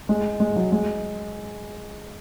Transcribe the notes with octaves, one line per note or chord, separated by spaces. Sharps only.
G#3
G#3
F#3
G#3